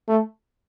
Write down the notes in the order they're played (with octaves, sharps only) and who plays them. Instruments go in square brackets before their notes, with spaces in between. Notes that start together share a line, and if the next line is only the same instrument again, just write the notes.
[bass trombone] A3